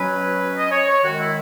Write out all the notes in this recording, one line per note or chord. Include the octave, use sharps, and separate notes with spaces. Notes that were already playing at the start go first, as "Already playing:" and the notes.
Already playing: B2 F#3 C#4 B4
D#5
C#5
C#5
F#2 D#3 G#3 F#4
E4